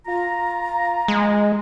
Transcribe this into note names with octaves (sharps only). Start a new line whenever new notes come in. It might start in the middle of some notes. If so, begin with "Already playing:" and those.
F4 A#5
G#3